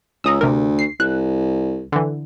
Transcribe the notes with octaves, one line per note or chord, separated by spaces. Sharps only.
C#2 A#5 D#6 E6
D2 C3 A#4
C7
C2 F#6
D3 E3